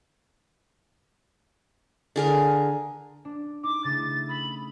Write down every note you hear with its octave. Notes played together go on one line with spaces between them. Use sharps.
D3 G#4 A#4
D4
D#4 D6
C#3 A3 E4 A6
B5 D#6 E6 B6